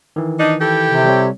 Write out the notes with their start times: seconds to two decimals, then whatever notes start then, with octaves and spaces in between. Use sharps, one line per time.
0.16 D#3 E3
0.40 D4 D#4
0.61 E4 G4 A4 G5
0.86 C3
1.05 G3 C4 C#5